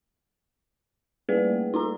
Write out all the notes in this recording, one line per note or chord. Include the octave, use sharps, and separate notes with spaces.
G3 A3 A#3 G#4 B4 D5
D#4 F4 A#5